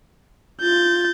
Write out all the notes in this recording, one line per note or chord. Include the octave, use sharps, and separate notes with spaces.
F4 G6 A6